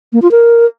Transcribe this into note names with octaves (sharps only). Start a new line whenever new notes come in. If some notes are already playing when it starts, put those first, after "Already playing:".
A#3
F4
A#4